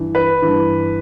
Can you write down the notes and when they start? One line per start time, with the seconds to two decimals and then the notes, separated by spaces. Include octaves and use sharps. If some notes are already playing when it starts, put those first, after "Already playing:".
Already playing: G2 E3
0.15 B4
0.42 G2 E3